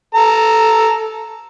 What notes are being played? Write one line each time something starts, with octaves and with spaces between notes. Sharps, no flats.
A4 A#5